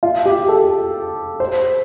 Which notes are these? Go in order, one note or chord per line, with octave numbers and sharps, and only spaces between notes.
F4
G4
A4
C5